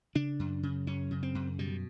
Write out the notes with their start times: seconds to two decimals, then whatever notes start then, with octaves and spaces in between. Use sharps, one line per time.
0.15 C#3 D4
0.39 F#2
0.63 C#3
0.87 F#2 C#4
1.11 C#3
1.23 C4
1.35 F#2
1.59 B2 G3